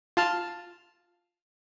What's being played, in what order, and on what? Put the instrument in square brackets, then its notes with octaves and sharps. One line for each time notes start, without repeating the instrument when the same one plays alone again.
[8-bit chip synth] F4 A5 F6